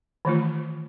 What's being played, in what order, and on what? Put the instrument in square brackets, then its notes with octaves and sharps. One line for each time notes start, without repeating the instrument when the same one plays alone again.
[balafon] D#3 E3 A3 F4